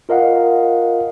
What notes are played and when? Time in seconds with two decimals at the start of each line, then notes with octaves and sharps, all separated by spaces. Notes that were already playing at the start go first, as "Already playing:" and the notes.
0.09 F4 A#4 D#5 F5 F#5